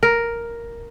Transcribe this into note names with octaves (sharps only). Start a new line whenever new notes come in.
A#4